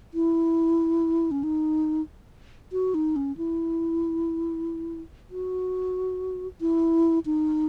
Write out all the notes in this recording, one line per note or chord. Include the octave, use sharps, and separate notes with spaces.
E4
C#4
D#4
F#4
D#4
C#4
E4
F#4
E4
D#4